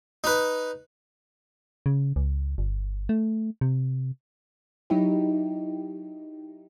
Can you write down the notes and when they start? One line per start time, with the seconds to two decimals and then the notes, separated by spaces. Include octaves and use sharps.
0.24 D#4 B4
1.86 C#3
2.16 C#2
2.58 G1
3.09 A3
3.61 C3
4.90 F#3 D#4 E4 G4